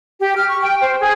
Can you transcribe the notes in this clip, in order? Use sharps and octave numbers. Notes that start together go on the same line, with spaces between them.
G4
F6
C#6
G5
C5
G#4